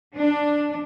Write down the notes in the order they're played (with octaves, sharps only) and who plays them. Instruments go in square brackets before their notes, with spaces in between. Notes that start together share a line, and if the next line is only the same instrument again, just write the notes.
[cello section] D4